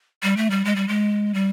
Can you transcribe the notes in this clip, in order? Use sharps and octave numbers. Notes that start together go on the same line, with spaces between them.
G3
A3
G3
G#3
G3
G#3
G3